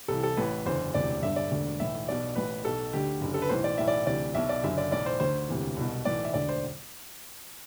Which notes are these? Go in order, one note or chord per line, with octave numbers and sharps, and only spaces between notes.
C2 C3 E3 A4
A4
A1 A2 E3 B4
F#1 E2 D3 C5
E1 D2 C3 E3 D5
G1 G2 D3 E5
D5
E1 D2 D3
B1 A2 E3 E5
B1 B2 D5
A1 A2 E3 B4
B1 B2 A4
D2 D3 G4
F#1 F#2 D3
A4
B4
B1 A2 E3 C5
D5
B1 A2 E3 E5
D5
D2 C3 E3 D5
B1 B2 E5
D5
F#1 F#2 D3 E5
D5
B1 A2 E3 D5
C5
D2 D3 C5
E1 D2 C3 E3
C2 B2
B1 A2 E3 D5
E5
E1 D2 D3 D5
C5